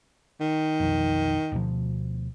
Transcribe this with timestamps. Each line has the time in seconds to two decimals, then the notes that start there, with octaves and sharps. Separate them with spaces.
0.40 D#3
0.80 B1 F2
1.52 D2 B2 F3